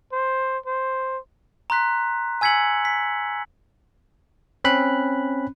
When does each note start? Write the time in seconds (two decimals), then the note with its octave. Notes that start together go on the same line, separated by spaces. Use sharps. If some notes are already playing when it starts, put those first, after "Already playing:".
0.12 C5
0.66 C5
1.70 A#5 C6 F#6 B6
2.41 G#5 E6 G#6 B6 C#7 F#7
2.85 B6
4.64 C4 C#4 B5 F#6